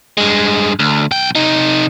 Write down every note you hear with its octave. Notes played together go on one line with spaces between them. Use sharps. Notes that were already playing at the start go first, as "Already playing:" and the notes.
G2 G#3
D2
B1 G5
C3 D#4